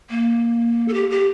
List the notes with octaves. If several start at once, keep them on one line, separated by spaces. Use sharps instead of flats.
A#3
A4
G4
G4